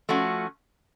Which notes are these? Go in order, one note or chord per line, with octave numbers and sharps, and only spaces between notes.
F3 A3 C#4 F#4